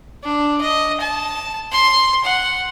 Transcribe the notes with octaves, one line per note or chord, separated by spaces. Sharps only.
D4
D#5
A5
C6
F#5